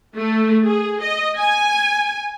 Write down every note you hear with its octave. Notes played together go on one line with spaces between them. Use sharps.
A3
G#4
D#5
G#5